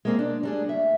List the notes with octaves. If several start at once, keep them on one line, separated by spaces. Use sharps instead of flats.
G#3 A#3 C4
D4
G3 D4 G#4
D2 E5